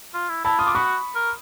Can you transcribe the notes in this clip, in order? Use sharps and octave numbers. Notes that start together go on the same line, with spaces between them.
F4
E4
E4 A5 B5
F4 D#6
D6
F#4 B5 C#6
A#4